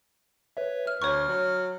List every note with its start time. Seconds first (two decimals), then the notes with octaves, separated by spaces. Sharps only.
0.57 B4 C#5 E5
0.87 F6
1.02 D2 C#5 C#6 F6
1.28 F#3